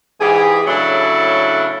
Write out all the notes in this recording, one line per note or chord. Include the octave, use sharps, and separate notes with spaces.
G#2 E3 G4 G#4
A2 C#3 F#3 D4 E4 A4